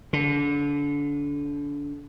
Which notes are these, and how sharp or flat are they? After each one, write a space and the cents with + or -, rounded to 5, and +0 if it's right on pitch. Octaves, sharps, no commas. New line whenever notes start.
D3 -30